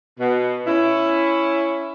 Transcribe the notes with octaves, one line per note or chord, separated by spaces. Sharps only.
B2
C#4 E4